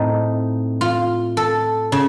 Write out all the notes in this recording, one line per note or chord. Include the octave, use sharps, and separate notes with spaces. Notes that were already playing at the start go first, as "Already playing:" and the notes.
Already playing: A2 A3 C4 D#4
F4
A4
C#3